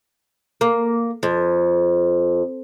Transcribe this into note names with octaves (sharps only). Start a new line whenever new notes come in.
A#3
F2